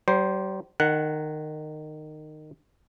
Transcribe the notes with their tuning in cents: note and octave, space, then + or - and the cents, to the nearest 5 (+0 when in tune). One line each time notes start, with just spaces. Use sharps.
G3 -40 C5 +0
D#3 -20 F#5 +0